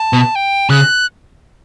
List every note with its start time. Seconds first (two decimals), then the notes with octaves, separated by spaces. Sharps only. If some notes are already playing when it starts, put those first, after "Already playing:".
Already playing: A5
0.13 B2
0.35 G5
0.69 C#3 F#6